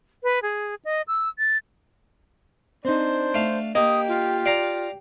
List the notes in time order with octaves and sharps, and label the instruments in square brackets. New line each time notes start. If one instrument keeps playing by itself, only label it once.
[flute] B4
G#4
D#5
E6
A6
[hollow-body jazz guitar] C4 D#4 [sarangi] D4 [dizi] C5
[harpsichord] A3 F5
[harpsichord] A#3 [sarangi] G4 [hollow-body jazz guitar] D#5 [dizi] D#6
[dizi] F4
[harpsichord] D5 F5 A#5